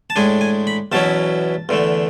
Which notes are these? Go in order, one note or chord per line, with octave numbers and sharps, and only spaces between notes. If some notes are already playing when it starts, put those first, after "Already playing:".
A5
A2 G#3 D4 G#5
G#5
B5
E2 B2 F#3 C#4 E4 A5
E2 D3 A3